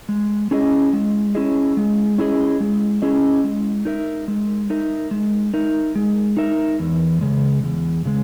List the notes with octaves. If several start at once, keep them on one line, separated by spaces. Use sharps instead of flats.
G#3
C#4 E4 G#4 D#5
G#3
C#4 E4 G#4 D#5
G#3
C#4 E4 G#4 D#5
G#3
C#4 E4 G#4 D#5
G#3
D#4 A#4 E5
G#3
D#4 A#4 E5
G#3
D#4 A#4 E5
G#3
D#4 A#4 E5
E2
C#3 G#3
E2
C#3 G#3